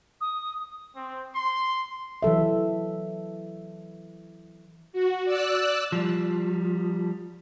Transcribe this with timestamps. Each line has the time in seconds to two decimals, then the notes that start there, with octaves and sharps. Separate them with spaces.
0.21 D#6
0.96 C4
1.35 C6
2.23 E3 F#3 A4 E5
4.93 F#4
5.25 D5 E6 F#6
5.92 F3 G3